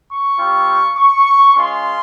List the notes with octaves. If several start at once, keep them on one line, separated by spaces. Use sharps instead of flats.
C#6
G3 C4 F4
C#6
G#3 C#4 F4 C6